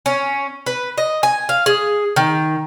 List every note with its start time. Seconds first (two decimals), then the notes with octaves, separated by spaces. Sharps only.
0.06 C#4
0.66 B4
0.98 D#5
1.23 G#5
1.49 F5
1.66 G#4
2.16 D#3